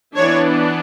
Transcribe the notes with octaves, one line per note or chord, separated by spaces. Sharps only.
E3 B3 D4 C#5